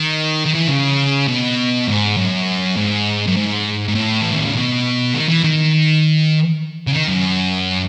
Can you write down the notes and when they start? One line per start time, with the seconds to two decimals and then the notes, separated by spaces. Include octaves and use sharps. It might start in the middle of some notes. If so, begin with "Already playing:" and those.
Already playing: D#3
0.46 D#3
0.54 E3
0.68 C#3
1.28 B2
1.88 G#2
2.17 F#2
2.77 G#2
3.27 F#2
3.37 G#2
3.88 G#2
3.95 A2
4.21 E3
4.32 D#3
4.44 C#3
4.55 B2
5.15 D#3
5.29 E3
5.44 D#3
6.87 C#3
6.92 D#3
7.08 F#2